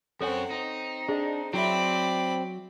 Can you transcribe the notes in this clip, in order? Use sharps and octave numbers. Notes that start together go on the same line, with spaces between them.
F#2 C4 F#4 A4 C#5 F#5 G#5
C4 D#4
D4 G#4 D#5
F#3 C4 E4 D5 E5 B5